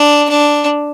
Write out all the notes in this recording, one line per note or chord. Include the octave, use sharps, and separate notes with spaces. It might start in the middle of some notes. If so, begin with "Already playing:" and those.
Already playing: D4
D4